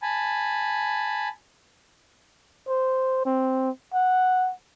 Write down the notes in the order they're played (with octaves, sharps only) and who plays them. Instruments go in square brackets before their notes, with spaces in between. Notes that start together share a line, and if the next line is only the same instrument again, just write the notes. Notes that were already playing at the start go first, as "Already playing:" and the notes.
[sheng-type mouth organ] G#5 A5 B5
[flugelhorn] C5
C4
F#5